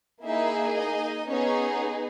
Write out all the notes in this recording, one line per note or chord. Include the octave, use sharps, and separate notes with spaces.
A#3 D#4 E4 G#4 E5
D#4 D#5
B3 C#4 D#4 G#4 C#5